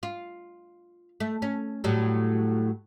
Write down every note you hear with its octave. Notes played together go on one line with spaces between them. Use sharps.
F4
A3
C#4
A2 F#3 G3